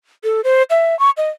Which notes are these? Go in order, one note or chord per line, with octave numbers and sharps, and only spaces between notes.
A4
C5
E5
C#6
D#5